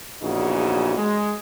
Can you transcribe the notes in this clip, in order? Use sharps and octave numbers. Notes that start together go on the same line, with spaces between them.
A#1 E2 C#3 D#4 F#4
G#3